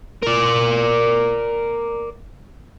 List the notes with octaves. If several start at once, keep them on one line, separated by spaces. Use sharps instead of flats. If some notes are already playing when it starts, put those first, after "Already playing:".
A#4 D5